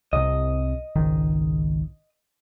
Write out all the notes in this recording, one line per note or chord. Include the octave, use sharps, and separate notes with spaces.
C2 C3 D#5
G#1 C#2 D#3